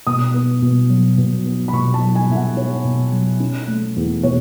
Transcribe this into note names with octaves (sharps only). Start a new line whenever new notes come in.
B2 D#6
B3
B2
F#3
B2
B3
B5
B2 C#6
A5
F#3
G#5
B2 E5
F#5
B3 C#5
B2
F#3
C#4
A3
E2
B2 C#5